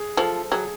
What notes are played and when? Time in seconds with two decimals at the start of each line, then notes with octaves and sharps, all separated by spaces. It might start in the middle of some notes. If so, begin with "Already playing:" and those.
Already playing: G#4
0.17 F3 A4
0.52 F#3 G#4